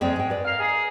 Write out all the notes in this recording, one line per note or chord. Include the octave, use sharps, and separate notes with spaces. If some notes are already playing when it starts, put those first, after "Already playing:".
F2 G#3 C4 D5
G#2 G5
B4 D5
A#3 F5
D#4 G#4